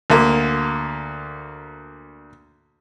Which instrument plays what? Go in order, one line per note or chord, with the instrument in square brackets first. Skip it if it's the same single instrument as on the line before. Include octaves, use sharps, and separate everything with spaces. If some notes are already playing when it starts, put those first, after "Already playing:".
[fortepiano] D2 A#3